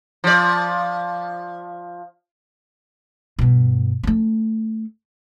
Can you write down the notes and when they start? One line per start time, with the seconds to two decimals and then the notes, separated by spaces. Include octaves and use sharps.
0.24 F3 D5
3.39 G2 B2
4.03 A3 C#4